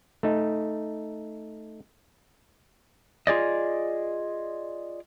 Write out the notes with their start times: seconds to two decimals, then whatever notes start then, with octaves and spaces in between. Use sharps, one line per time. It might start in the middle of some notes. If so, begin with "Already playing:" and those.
0.23 A3 D#4
3.27 F4 G#4 D5 D#5